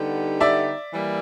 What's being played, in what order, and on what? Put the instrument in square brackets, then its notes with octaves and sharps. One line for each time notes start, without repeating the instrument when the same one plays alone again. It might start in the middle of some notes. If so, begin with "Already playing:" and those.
Already playing: [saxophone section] D3 G3 B3 D#4 G4
[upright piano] D5 E5
[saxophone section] E3 G3 A#3